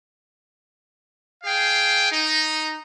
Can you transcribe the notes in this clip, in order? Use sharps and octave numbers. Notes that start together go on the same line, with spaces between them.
G#4 F5 G5
D#4